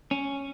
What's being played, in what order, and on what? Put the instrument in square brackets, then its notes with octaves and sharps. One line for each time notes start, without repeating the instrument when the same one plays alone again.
[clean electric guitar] C#4